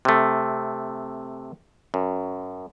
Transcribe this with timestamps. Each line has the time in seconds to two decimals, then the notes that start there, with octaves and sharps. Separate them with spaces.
0.05 C3 A3
1.94 F#2